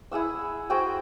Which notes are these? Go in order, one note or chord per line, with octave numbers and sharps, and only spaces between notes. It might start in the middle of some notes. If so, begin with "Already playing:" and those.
E4 G#4 F#5 E6
F#4 G#4 C5 G5